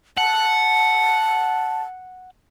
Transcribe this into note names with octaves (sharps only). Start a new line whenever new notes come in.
F#5 A5